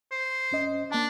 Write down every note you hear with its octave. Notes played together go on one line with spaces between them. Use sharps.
C5
F#2 C#4 D#5
A#3 D4 A5